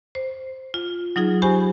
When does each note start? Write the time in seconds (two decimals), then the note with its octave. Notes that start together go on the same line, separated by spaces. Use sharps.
0.15 C5
0.74 F4
1.16 F#3 D#4 F4 G#4
1.42 G4 C5 G#5 B5 C#6